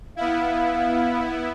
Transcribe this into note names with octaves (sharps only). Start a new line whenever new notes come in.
B3 E4 F5